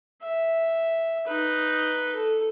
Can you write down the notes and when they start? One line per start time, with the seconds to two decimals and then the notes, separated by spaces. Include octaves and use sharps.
0.22 E5
1.27 D#4 B4
2.15 A4